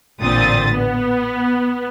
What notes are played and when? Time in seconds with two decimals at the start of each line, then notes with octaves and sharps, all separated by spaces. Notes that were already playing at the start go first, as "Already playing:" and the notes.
0.21 A1 A#2 D3 C4 D#6 A6
0.73 B3